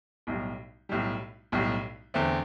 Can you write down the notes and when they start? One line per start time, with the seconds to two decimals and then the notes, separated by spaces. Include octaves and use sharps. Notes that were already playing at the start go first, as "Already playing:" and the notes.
0.27 B1 A2 G3
0.89 B1 A2 G3
1.52 B1 A2 G3
2.14 E2 D3 A3 C4